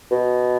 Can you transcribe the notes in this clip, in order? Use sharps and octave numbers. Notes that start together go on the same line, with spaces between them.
B2